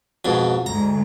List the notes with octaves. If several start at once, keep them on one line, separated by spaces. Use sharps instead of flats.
F2 G#2 B2
D2 G#2 A#5